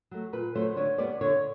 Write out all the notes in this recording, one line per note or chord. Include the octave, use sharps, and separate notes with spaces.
F#3 A3
A#2 B4
F#3 A3 C5
D3 C#5
G3 B3 D5
D3 C#5